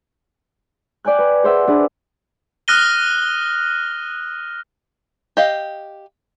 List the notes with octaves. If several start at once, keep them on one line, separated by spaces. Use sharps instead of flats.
D5 G5 G#5 F#6
B4
G#4 C5 E5 F#5
D4 G#4 B4
D#6 F6 F#6 A#6 D#7 G7
G4 D#5 F5